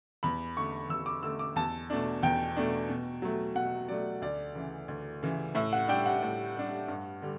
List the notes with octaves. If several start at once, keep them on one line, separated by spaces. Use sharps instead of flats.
E2 B5
D3 A3 C#6
E2 E6
D6
D3 A3 E6
D6
E2 A5
B2 A3 D4
E2 G5
B2 A3 D4
B2
F#3 A3
B2 F#5
F#3 A3 D5
D2 D5
C#3 E3
D2
C#3 E3
A2 E5
F#5
G3 D4 G5
F#5
A2
G3 D4
G2
D3 G3